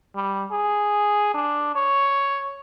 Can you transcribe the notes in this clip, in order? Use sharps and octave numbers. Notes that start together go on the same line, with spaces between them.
G3
G#4
D4
C#5